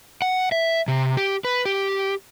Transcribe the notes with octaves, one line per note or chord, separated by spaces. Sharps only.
F#5
E5
C3
G4
B4
G4